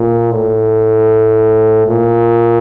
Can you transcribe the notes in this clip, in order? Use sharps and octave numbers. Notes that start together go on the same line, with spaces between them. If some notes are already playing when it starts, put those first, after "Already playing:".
Already playing: A#2
A2
A#2